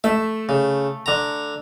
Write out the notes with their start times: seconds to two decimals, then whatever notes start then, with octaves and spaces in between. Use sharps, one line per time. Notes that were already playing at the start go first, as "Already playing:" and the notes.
0.04 A3 E5
0.49 C#3
1.06 D3 A#5